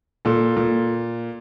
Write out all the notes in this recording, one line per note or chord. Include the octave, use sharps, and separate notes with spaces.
A#2 A4
A#2